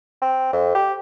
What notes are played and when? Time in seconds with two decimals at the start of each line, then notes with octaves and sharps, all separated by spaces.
0.22 C4
0.53 F2
0.75 G4